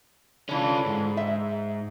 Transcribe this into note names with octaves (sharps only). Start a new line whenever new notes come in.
D3 E3 C#4 F4
G#2
E5